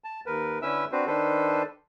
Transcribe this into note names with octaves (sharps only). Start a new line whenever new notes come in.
A5
D#2 A#4 B4
D3 C#4 E4 B4 E5 E6
C4 D4 F#4 B4 C5
D#3 D4 A4 B4 C5